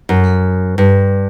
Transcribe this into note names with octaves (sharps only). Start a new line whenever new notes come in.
F#2
G2